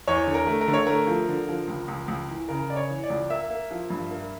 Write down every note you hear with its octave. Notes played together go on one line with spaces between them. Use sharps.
E2 C#5
D3
A#4
A3
A#4
D3
C#5
A3 A#4
F3
D3
F3
C#2
C#2
C#2
E3
C#3 A#4
C#3 D5
C#5
E3
D5
C#2
A#3 E5
A#3
F3
G2
A#3